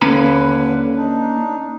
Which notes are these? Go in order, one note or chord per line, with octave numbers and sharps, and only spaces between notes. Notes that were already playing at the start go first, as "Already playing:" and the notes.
D#2 D3 A#3 C#4 B4 B5
D4 D#4